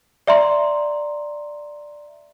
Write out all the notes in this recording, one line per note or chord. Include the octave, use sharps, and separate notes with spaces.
D5 E5 A#5 C6